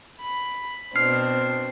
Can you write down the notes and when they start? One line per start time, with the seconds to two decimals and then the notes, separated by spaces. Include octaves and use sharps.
0.21 B5
0.96 B2 C4 D4 F6 C7